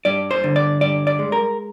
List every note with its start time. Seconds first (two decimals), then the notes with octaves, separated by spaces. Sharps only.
0.05 G2 D5
0.31 C5
0.44 D3
0.56 D5
0.81 G2 D5
1.07 D5
1.19 G#3
1.32 A#4